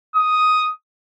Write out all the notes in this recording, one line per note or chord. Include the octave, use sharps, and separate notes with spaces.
D#6